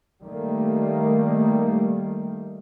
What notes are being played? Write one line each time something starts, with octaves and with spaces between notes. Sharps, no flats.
D#3 G3 A3 A#3